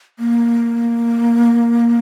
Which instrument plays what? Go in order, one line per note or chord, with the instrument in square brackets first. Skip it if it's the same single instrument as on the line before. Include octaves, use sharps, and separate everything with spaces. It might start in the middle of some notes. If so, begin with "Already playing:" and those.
[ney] A#3